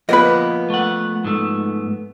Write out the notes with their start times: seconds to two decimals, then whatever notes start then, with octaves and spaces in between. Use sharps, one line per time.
0.09 F3 A#3 B3 B4 D#5
0.70 A3 F#5
1.24 G#2 A3